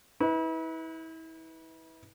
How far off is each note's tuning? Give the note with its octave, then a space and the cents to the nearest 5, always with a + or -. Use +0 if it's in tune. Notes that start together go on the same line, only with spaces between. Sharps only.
E4 -35 B4 +0